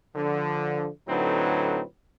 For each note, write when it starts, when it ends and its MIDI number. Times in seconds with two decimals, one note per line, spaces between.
0.16 0.87 50
0.16 0.87 53
1.08 1.82 45
1.08 1.82 50
1.08 1.82 54
1.08 1.82 60
1.08 1.82 63
1.08 1.82 71